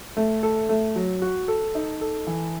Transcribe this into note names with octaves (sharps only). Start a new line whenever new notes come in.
A3
A4
A3
F#3
F#4
A4
D#4
A4
E3